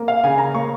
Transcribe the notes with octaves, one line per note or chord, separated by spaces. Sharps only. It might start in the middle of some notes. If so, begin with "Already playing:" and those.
Already playing: A#3
F5
C#3 G#5
A#5
A#3 C#6